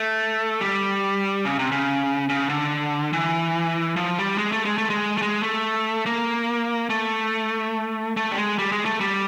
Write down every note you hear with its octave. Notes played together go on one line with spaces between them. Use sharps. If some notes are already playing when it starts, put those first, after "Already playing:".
Already playing: A3
G3
C#3
C3
C#3
C#3
D3
E3
F3
G3
G#3
A3
G#3
A3
G#3
A3
G#3
A3
A#3
A3
A3
G3
G#3
G3
G#3
A3
G3